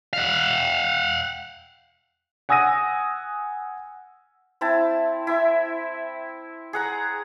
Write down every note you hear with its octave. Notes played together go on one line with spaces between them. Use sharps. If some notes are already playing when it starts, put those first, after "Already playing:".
F5 F#5
F#5 G#5 D#6 E6 A#6 D#7
C4 E4 A5
E4 E5
G#4 F#5 A#5